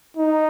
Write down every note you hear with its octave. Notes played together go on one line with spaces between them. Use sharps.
D#4